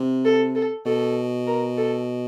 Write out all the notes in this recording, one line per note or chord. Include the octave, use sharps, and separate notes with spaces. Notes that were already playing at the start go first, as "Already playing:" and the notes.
Already playing: C3
A4
A4
B2 A4
A#4
A4